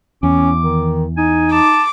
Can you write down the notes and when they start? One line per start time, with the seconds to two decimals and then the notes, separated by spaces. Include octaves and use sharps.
0.23 E2 C#4 D6
0.63 D#3
1.17 D#4 G#5
1.52 A5 D6